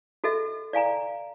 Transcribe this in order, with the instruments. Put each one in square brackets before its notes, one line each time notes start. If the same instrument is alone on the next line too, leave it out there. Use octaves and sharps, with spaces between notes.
[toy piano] F#4 A4 D#5 E5
D5 F5 G#5 A#5